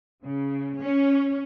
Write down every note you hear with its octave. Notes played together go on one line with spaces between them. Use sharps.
C#3
C#4